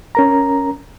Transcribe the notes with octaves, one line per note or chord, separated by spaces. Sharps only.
C#4 A#4 A#5